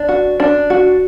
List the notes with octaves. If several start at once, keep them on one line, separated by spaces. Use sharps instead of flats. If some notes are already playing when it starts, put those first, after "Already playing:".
Already playing: D4
F#4
D4
F#4